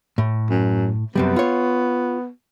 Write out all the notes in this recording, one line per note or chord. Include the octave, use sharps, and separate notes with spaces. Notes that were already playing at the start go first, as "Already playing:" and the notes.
A2
F#2
F#2 C3 G3 B3
F4 C#5